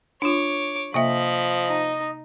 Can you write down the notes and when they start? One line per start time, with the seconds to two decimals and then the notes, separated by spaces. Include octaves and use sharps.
0.22 D4 F4 C#5 D6
0.94 C3 F3 A#3 D#5 E5 B5
1.67 D#4